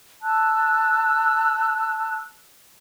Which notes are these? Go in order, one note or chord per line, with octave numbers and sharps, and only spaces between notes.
A5 E6 F#6